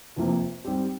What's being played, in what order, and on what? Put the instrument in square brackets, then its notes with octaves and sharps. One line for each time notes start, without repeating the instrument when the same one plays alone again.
[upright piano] F1 F2 C3 F3 A#3
G#2 G3 C4 G4